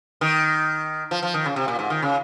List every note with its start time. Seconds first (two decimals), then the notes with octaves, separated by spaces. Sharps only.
0.21 D#3
1.11 F3
1.23 F3
1.34 D#3
1.46 C#3
1.56 C3
1.68 A#2
1.79 G#2
1.90 D#3
2.02 C#3